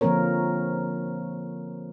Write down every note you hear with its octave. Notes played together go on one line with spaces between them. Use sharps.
D3 F3 A#3 C4 A#4 C#5